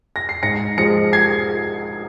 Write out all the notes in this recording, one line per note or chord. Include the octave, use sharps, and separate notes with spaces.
A#6
C7
G#2 A#6 C#7
F3 G#3 A#6 C#7
G#6 C7